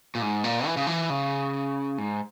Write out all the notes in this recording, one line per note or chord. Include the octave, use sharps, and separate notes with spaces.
A#2
G#2
A#2
E3
C#3
E3
C#3
G#2